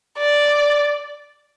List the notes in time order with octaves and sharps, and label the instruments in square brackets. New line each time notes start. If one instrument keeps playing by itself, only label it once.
[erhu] D5